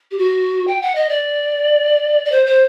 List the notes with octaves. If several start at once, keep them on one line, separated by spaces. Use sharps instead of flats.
G4
F#4
G5
F#5
D#5
D5
D5
C5
C5